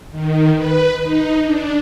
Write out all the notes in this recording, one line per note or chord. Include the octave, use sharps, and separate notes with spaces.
D#3
B4
D#4
D4